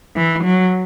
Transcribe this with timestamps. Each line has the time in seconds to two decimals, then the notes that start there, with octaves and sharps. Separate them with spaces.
0.16 E3
0.44 F#3